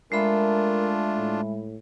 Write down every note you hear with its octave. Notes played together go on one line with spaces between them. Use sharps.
G#3 A3 D4 F4 A#4 E5 B5
A2